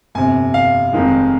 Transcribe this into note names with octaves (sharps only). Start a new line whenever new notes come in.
G1 F2 C3 G#5
F5
F1 F2 D#3 G#3